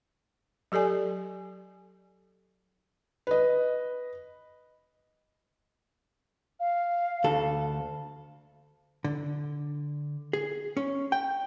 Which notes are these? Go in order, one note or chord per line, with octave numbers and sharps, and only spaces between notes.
F#3 G4 A4 D5 G#5
B4 D#5
F5
D2 A4
D3
G#4
C#4
G5